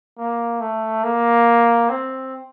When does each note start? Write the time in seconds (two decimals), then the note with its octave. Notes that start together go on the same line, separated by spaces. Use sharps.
0.18 A#3
0.61 A3
1.04 A#3
1.90 C4